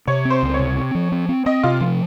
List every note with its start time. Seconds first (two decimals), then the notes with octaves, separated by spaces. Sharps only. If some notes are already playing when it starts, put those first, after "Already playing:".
0.08 C3 C#5
0.25 C4
0.30 C5
0.43 C#2
0.54 C#5
0.59 C3
0.77 C4
0.95 F3
1.12 C4
1.29 C4
1.46 C4 D#5
1.63 C3 F4
1.81 F3